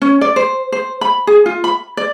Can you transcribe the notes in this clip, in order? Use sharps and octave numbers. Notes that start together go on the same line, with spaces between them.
C#4
D5
C5
C5
B5
G#4
F4
B5
D5